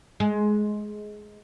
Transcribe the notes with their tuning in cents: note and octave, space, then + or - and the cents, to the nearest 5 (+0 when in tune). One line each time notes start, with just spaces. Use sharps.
G#3 +15